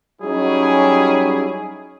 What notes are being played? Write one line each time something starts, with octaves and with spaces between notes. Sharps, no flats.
F#3 G3 C#4 D#4 E4 G#4